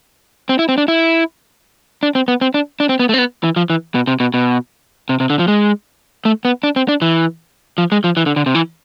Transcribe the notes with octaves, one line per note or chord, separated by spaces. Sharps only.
C4
E4
C4
D4
E4
D4
C4
B3
C4
D4
D4
C4
B3
A3
C4
B3
E3
F3
E3
B2
C3
B2
B2
C3
C3
D3
F3
G#3
A3
B3
D4
C4
D4
E3
F3
G#3
F3
E3
D3
D3
C3
E3